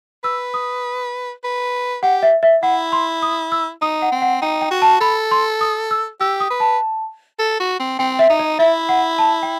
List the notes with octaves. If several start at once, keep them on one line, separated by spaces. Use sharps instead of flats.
B4 E6
D#6
B4
G4 F#5
E5
E5
E4 F#5
C6
D#6
E6
D#4 D#6
F#5
C4
F#5
D#4 G5
G5
F#4
A5
A4 B5
C6
D#6
E6
G4 E6
D#6
B4
A5
A4
F#4
C4
C4 G5
E5
D#4
D#5
E4 E5
F#5
A5
G5